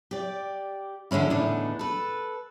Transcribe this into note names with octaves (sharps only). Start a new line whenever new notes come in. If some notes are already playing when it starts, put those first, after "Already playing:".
G4 D5
E2 D3 G#3 C#4 E4
E2 A2 D3 B3 D4 D#4
A4 B4